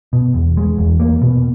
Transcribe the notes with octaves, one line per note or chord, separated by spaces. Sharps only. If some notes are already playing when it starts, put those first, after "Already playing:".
B2
E2
G#3
E2
A#3
B2